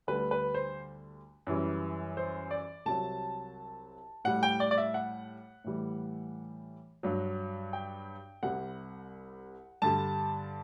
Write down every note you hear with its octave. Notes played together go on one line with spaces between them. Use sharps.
D2 D3 G3 B4
B4
C5
F#2 E3 G3
C5
D5
C2 C3 F#3 A5
A2 G3 F#5
G5
D5
D5
E5
F#5
A2 E3 G3
G2 F#3
G5
C2 C3 G3 F#5
G2 D3 G3 A5